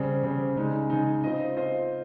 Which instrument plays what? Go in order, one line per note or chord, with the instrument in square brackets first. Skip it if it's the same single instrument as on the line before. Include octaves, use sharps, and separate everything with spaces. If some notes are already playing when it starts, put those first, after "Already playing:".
Already playing: [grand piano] C#3 G3 C4
C#3 G3 C4
C#3 G#3 D#4
C#3 G#3 D#4
C4 F4 C5 D#5
C4 F4 C5 D#5